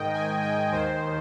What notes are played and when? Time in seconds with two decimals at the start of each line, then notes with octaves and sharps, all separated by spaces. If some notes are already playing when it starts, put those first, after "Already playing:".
Already playing: G#2 D#3 D#5 G5
0.13 G#5
0.42 G5
0.71 D#2 D#3 C5